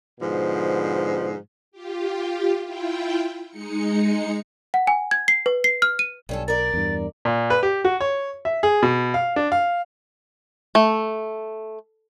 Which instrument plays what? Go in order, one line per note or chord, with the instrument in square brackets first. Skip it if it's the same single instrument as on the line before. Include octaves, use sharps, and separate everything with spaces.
[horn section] G#2 B2 D3 F3
[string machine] F4 G4
E4 F4 G5
G#3 D#4 C#7
[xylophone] F#5
G#5
G#6
C7
B4
C7
F6
D#7
[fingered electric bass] B1 [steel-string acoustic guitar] G2 C#4 A4
[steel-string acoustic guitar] A#4 D5 [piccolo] A6
[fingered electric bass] E2 G2
[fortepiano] A#2
B4
G4
F#4
C#5
E5
G#4
B2
F5
D4
F5
[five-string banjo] A3